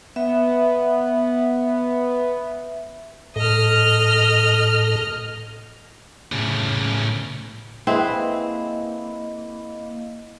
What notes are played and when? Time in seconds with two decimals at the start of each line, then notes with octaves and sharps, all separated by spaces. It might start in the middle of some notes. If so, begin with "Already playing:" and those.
0.16 B3 E5
3.36 A2 A4 D#5 F6
6.32 A2 C#3
7.87 A#3 C4 E4 G#4 B4 D#5 B5